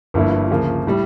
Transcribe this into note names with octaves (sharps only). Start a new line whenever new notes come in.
G1 G2 F3 A#3 E4
D2 C#3 F3 A#3
A2 G3